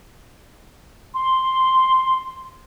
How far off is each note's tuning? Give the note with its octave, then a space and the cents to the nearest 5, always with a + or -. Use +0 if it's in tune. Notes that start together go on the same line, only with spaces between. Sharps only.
C6 +0